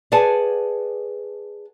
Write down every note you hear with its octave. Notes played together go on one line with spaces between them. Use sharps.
G#4 B4 D5 F#5 G#5 A5